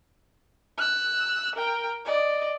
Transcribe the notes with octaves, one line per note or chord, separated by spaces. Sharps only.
E6 F#6
A#4 G5
D5 D#5